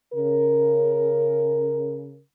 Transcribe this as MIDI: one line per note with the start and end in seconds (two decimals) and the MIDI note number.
0.14 2.19 49
0.14 2.19 70